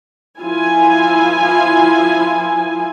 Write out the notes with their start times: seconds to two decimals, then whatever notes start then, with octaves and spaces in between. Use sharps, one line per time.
0.39 F3 E4 F4 G#5